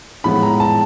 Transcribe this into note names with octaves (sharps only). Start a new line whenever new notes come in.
A2 F3 G#3 B3 B5
A#5
A5